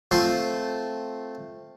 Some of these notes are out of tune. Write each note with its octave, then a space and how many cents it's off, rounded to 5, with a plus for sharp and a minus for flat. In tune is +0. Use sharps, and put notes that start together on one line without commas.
A3 -5 C4 +0 F4 +0